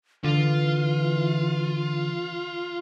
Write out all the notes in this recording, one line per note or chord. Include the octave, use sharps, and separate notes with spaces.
D3 E3 F4